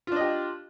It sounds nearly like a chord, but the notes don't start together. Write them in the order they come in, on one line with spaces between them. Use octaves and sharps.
F4 D4 D#5 G4